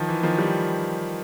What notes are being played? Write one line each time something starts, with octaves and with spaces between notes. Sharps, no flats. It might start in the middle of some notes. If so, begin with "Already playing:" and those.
Already playing: D#3 F3
E3
D#3 F3
G3